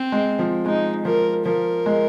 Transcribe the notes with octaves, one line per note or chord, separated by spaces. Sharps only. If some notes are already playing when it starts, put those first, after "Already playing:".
Already playing: C4
G#3
F3
G#3 D#4
F3 A#4
F3 A#4
G#3